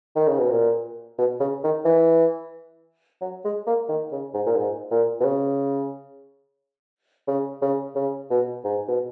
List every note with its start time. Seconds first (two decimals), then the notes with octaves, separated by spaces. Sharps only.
0.16 D#3
0.27 C#3
0.39 B2
0.51 A#2
1.18 B2
1.40 C#3
1.64 D#3
1.85 E3
3.21 F#3
3.44 G#3
3.67 A#3
3.89 D#3
4.12 C#3
4.34 G#2
4.46 A#2
4.57 G#2
4.91 A#2
5.20 B2
5.24 C#3
7.28 C#3
7.62 C#3
7.96 C#3
8.30 B2
8.64 G#2
8.88 B2